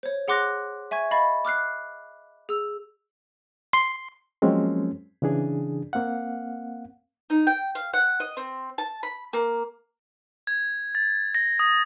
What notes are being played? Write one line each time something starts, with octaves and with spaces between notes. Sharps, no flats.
C5 C#5
G#4 F#5 C6 D6 F#6 A#6
E5 G#5 C#6 G#6
D#5 F5 B5 C#6 A6
D6 F6 F#6 C7
G#4 E6
C6
F3 F#3 G#3 A#3 C4 C#4
C#3 E3 D4 G#4
A#3 C4 F5 F#5
D#4
G5
F5
F#5
D#5
C4
A5
B5
A#3
G#6
A6
A#6
D#6